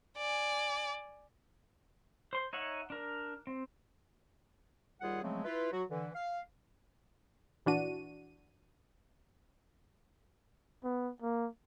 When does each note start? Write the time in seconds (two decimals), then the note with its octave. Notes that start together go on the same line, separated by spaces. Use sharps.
0.17 D5 G#5
2.33 C5 C6
2.53 D#4 C#5 E5 F#5
2.90 D4 A#4
3.47 C4
5.01 D#2 G3 F4 G#4 F#5
5.23 C#3 F3 F#3 G#3 A3 C4
5.45 E4 F4 B4
5.72 F#3 F#4
5.89 D3 E3
6.15 F5
7.66 A#1 E3 D4 F#4 D#7
10.84 B3
11.22 A#3